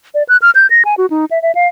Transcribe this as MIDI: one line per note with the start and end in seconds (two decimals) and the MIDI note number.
0.14 0.23 74
0.29 0.37 90
0.42 0.50 89
0.55 0.67 91
0.70 0.83 94
0.85 0.95 80
0.98 1.06 66
1.10 1.25 63
1.31 1.41 76
1.42 1.52 76
1.55 1.68 77